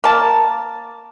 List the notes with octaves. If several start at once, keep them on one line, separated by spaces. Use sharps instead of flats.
A#3 A5